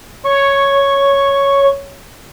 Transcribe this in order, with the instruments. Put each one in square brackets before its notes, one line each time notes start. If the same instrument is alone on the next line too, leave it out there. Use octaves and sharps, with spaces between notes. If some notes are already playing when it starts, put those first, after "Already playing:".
[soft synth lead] C#5 [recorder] C#6